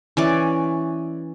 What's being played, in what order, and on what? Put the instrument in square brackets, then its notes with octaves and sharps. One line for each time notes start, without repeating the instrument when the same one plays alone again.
[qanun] E3 C#4 D5